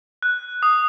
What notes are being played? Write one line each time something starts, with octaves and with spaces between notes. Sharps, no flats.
F#6
D#6